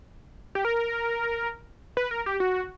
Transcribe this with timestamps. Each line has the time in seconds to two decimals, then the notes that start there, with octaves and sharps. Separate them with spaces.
0.55 G4
0.65 A#4
1.97 B4
2.11 A#4
2.26 G4
2.40 F#4